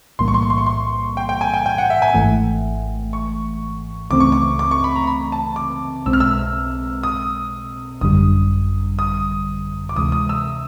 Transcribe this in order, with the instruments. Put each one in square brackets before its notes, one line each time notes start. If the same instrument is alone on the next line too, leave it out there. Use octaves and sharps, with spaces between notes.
[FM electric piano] B1 A2 E3 G3 A#3 [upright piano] C6
[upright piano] C#6
C6
C#6
C6
C#6
C6
G5
G5
G#5
G5
G5
F#5
E5
G#5
[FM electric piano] G#1 G#2 E3 A3
[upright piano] C#6
[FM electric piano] C#2 C#3 E3 A3 C4 [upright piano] D6
[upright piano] C#6
D6
D6
C#6
B5
A#5
B5
A5
D6
[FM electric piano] B1 B2 G#3 C4 [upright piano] E6
[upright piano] F6
E6
D#6
[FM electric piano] G#1 F#2 D3 G3 [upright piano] D#6
[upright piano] D#6
D6
[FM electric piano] D2 C3 E3 G#3 [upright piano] D#6
[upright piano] D#6
E6